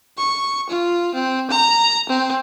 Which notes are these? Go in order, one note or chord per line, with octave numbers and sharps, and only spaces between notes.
C#6
F4
C4
A#5
C4